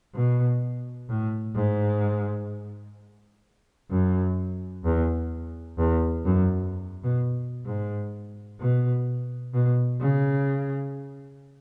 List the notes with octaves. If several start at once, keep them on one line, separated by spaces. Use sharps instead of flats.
B2
A2
G#2
F#2
E2
E2
F#2
B2
G#2
B2
B2
C#3